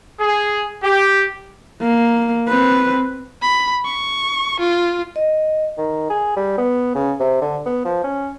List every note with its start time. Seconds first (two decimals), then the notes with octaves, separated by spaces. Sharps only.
0.20 G#4
0.83 G4
1.81 A#3
2.48 C4 B4
3.42 B5
3.85 C#6
4.60 F4
5.16 D#5
5.78 D#3
6.10 G#4
6.37 G3
6.58 B3
6.95 C#3
7.20 C3
7.41 D3
7.66 B3
7.85 F3
8.04 C#4